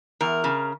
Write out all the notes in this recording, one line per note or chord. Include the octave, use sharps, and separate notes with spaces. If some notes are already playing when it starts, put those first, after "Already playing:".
E2 A#4
C#3